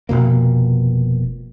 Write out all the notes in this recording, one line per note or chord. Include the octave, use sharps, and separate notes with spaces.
F1 D#2 B2 A#3